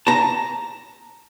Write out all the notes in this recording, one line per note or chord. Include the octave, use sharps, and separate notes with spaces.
A5 A#5